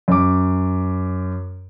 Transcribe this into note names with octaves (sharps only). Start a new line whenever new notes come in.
F#2 D6